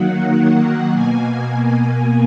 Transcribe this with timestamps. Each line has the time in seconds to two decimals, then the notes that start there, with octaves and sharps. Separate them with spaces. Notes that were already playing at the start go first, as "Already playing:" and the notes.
Already playing: D#3 F#3 A#3 F#5
0.93 B2 A#3 G#5